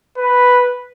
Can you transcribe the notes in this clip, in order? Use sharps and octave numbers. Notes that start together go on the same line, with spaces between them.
B4